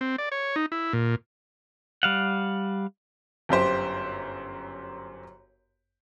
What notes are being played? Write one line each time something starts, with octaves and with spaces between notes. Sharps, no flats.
C4
D5
C#5
D#4
E4
A#2
G3 F5 F#5
G1 F#2 G4 C5